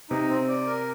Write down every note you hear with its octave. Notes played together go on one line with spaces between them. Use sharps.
C3 D#4
C4
D5
A#4